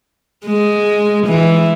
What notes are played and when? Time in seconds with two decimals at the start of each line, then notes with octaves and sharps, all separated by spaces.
0.46 G#3
1.27 E3